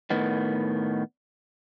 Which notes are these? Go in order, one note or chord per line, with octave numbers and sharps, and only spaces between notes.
A2 D#3 B3